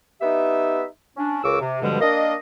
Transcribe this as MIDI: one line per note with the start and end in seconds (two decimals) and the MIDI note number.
0.21 0.85 59
0.21 0.85 63
0.21 0.85 67
0.21 0.85 76
1.17 1.39 61
1.17 1.39 62
1.44 1.58 37
1.44 1.58 49
1.44 1.58 70
1.44 1.58 85
1.44 1.58 86
1.44 1.58 88
1.60 1.77 48
1.81 1.99 43
1.81 1.99 47
1.81 1.99 50
1.81 1.99 53
1.81 1.99 55
1.81 1.99 56
2.00 2.35 58
2.00 2.35 62
2.00 2.35 70
2.00 2.35 75